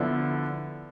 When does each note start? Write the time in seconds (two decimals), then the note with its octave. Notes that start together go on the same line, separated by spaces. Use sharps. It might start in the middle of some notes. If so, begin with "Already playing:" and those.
Already playing: D3 F3 B3 E4